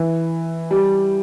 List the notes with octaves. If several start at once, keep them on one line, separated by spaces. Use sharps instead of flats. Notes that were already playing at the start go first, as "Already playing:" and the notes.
Already playing: E3
G3